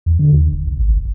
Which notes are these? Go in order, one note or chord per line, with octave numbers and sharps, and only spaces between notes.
E2
D3
D#2
E1
C2
G#1
F#1